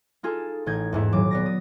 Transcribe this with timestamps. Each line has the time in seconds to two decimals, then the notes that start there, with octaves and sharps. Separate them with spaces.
0.23 D#4 F4 G#4 A4
0.66 A1 D#4 G6 G#6
0.92 E2 G#2 E4
1.13 D#1 F#3 D6
1.31 B3 D5 A#6
1.46 D#6